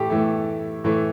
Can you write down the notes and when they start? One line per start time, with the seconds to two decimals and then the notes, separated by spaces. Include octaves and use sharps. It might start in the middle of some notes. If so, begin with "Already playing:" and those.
Already playing: A2 E3 A3 G4 A4
0.10 A2 E3 A3
0.84 A2 E3 A3